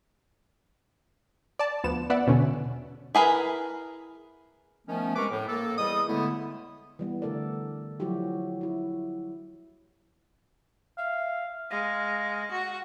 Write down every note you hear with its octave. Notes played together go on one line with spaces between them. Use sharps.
D5 A5
D2 F3 B3 E7
B3 D5 E5 F#5
E2 B2 D3 C#4
E4 G#4 A#4 B4
D#3 F3 A3 B3 C#4
C3 G#3 A#4 B4 C#6 D6
A2
A#3 A4
E2 G3 D#5 D#6
A2 D3 G#3 A3 B3 E4
E3 G3 B3
D3 A3 A4 A#4 D5
F3 F#3 E4 F#4 G4
E4 F#4
E5 F5
G#3 F5 A#6
F#4